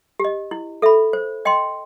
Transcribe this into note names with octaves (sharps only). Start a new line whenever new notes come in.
G4
D#5
E4
A4 E5 B5
C5
D#5 G5 C6